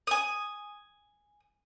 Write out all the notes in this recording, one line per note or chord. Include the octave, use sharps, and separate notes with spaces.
G#5 D#6